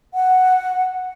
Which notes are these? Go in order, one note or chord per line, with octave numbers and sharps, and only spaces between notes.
F#5